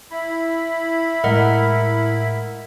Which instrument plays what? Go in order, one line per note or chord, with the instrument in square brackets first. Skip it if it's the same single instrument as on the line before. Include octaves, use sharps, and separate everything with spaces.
[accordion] E4 B5
[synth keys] A2 G#3 D7 [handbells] A#4 D#5 F#5